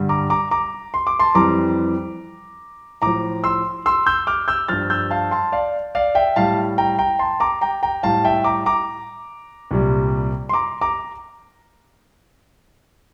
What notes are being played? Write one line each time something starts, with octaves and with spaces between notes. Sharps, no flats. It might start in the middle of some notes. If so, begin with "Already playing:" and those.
Already playing: G2 D3 G3
A#5 D6
A#5 D6
A#5 D6
C6
D6
A5 C6
F2 E3 G3 A#5 D6
A2 F3 A#5 D6
C6 E6
C6 E6
E6 G6
D6 F6
E6 G6
G2 F3 F6 A6
E6 G6
F5 A5
A5 C6
D5 F5
D5 F5
E5 G5
A2 G3 F5 A5
G5 A#5
G5 A#5
A5 C6
A#5 D6
G5 A#5
G5 A#5
A2 G3 F5 A5
E5 G5
A#5 D6
A#5 D6
C2 A#2 G3
C6
A#5 D6
A#5 D6